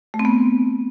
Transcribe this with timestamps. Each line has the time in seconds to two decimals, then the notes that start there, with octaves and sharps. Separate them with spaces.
0.14 A3
0.19 C4
0.25 B3